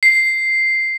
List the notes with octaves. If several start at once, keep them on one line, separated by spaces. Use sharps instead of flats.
C7